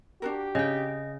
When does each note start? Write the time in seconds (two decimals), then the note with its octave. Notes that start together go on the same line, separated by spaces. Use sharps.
0.22 D4 F#4 G4 A#4
0.55 C#3 D#5 G5